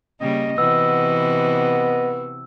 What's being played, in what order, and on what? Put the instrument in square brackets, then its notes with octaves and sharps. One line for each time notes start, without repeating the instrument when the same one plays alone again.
[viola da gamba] C#3 G3 A#3 [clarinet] D#5
[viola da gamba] C3 E3 F#4 [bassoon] B3 [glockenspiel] E6